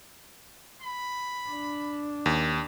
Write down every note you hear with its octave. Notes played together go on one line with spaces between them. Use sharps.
B5
D4
D#2